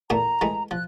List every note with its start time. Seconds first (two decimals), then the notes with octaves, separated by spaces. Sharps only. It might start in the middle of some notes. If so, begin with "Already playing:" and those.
0.10 E2 A#2 A3 A#5
0.41 E3 G#3 A3
0.71 F3 F#6